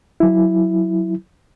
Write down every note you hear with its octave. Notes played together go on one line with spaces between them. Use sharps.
F#3 E4